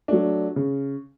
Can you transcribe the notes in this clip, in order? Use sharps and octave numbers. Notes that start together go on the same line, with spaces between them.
F#3 A3 D4
C#3